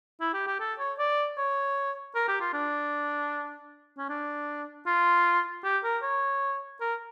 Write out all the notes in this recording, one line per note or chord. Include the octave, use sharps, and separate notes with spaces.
E4
G4
G4
A4
C#5
D5
C#5
A#4
G4
F4
D4
C#4
D4
F4
G4
A#4
C#5
A#4